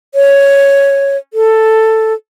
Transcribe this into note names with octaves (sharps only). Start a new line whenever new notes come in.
C#5
A4